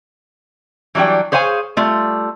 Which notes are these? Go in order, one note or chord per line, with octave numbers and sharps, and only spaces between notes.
E3 F#3 G3 D4 G5
G#4 C5 C#5 F5 G#5
G3 A3 F4